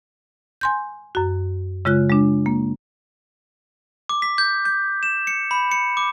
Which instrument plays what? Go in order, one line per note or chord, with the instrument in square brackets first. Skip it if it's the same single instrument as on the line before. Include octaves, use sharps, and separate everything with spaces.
[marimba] G#5 C6 G6
F#2 F#4
C#3 G#3 F4 F#6
G#3 D4
A#3
[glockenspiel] D6
B6
G6
G6
E7
C#7
B5
C#7
D6